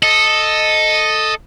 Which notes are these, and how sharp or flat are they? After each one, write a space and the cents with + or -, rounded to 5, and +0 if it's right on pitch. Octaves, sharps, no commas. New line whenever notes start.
A4 +0 D#5 +0